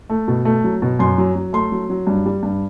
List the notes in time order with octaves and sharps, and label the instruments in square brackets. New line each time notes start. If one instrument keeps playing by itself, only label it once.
[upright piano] A3
B2
A3
F#3
B2
F#2 C6
F#3
F#3
A3 C6
F#3
F#3
G2
G3
G2